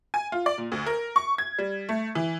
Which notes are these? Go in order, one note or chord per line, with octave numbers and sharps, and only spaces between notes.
G#5
F4
D5
A#2
D2
A#4
C#6
G#6
G3
A3
E3